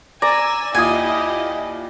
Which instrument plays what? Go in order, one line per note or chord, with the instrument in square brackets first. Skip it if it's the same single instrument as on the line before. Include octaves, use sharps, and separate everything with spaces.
[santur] D5 [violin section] G#5 E6 [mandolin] A#5
[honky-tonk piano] D#2 F4 D#6 [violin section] E4 G4 D#5 [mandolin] G#5